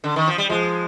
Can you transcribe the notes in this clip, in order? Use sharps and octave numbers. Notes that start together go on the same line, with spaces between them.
D3
D#3
F3
G3
F3 G#3